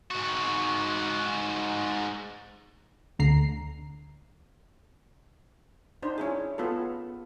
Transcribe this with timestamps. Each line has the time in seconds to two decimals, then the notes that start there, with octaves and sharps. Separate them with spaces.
0.11 G#2 F#4
3.19 D2 D3 A#5 C7
6.02 D4 D#4 C5
6.18 C#4 E4 G#4
6.58 B3 F4 G#4 A4